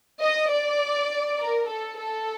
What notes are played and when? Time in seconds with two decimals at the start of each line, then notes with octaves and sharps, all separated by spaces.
0.22 D#5
0.52 D5
1.40 A#4
1.69 A4
1.99 A4